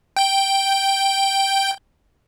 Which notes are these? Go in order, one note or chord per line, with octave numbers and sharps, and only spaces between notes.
G5 G6